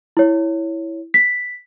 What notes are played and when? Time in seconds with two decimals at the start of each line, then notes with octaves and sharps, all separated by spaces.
0.17 E4 C#5
1.14 B6